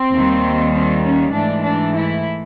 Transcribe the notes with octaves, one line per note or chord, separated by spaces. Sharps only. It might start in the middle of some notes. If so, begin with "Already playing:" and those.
Already playing: C4
D#2 D#3 G3
C4
C#4
G#2 E3 A3 D4
D4
E4